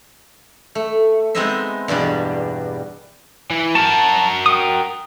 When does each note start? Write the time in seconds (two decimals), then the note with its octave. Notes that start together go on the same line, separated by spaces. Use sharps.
0.75 A3
1.35 G#3 B3 C4 D#4 D#5 E5
1.88 E2 G2 B2 G3
3.51 E3
3.75 F#4 A#4 A5
4.46 G5 D#6